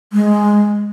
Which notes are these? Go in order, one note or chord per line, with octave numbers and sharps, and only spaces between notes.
G#3